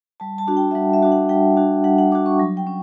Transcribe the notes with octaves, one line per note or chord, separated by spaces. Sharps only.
G3 A5
A5
D4 F#4
G5
E5
G3 F#5
E5
D4 F#4
F#5
G3 G5
D4 F#4
G3 F#5
F#5
D4 F#4 D6
C#6
F#3
G5
C#4